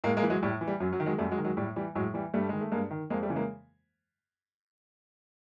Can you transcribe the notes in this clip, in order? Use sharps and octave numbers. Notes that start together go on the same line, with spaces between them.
A2 G#3 A#3
G#3 A#3
E3
F#3 G#3
A2 G3
E3
G3
F#2 F#3
F#3
D#3
F#3 G#3
F#2 G3 A3
F#3 G#3
D#3
F#3 G#3
A2 G3
E3 G3
A2 F#3 G#3
E3 G3
G2 G3 A3
D#3 G#3
A3
G2 G#3 A#3
D#3
F2 G#3 A#3
G3 A3
C#3 E3
G#3 A#3